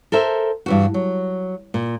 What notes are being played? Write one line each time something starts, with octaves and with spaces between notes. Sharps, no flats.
A4 A#4 C5 E5
G2 E3 F#4
F#3
A#2